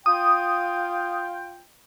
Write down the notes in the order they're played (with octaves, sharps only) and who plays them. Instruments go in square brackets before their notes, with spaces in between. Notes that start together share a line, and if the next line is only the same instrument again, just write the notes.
[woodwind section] F4 G5 [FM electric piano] D#6